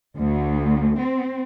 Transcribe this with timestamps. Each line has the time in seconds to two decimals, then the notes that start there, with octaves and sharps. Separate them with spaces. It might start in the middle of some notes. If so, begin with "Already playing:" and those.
0.18 D2
1.00 C4